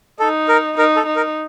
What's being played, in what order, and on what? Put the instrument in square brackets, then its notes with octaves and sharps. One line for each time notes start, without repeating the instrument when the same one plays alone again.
[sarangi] D#4 [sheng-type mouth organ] A4
[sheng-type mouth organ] A#4
[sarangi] D#4 [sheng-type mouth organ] A#4
[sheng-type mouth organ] A4
[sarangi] D#4
[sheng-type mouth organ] A#4